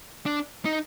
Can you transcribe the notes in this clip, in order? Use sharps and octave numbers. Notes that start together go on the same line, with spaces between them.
D4
D#4